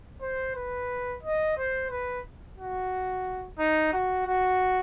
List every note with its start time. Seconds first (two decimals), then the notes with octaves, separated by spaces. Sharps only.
0.22 C5
0.56 B4
1.23 D#5
1.58 C5
1.91 B4
2.58 F#4
3.59 D#4
3.93 F#4
4.27 F#4